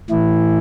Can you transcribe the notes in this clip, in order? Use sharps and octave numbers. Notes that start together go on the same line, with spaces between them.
A2 E3 E4